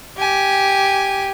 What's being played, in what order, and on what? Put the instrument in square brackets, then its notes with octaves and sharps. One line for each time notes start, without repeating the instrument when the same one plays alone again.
[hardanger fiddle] G4 G#5